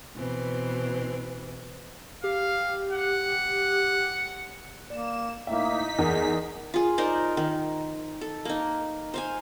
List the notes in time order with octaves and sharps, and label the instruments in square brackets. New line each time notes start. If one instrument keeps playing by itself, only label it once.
[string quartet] B2 E3 C4
[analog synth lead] G4 [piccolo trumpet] F5
[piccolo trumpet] F#5
[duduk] A#3 [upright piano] D5 [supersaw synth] E7
[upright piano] A2 E5 [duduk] A#3 [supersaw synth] D#4 B6
[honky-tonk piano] E2 [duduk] G#4 [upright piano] A#4
[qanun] F4 G#4
D#4 A#4 C5 D5
D#3
A4
A#3 D#4
C5 F5 G#5